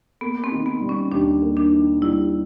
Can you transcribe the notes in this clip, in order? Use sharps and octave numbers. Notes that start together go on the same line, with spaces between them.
A#3 B3
C4
D#3
B3
G3
C#4
D#2 D4
A#3
D4
D#3
G3 E4